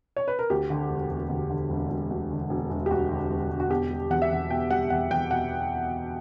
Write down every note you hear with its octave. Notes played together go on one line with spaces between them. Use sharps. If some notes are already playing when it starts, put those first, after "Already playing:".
C#5
B4
A#4
D2 G4
D3
E1
E1
D2
D3
E1
E1
D2
D3
E1
E1
G4
D2 F#4
D3
E1
E1
F#4
B2 G4
G3
E2 F#5
E5
E2 F#5
B2 G5
G3 F#5
E2 F#5
E2 G5
B2 F#5